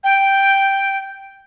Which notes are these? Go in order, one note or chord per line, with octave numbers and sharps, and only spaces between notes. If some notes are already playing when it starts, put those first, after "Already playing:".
G5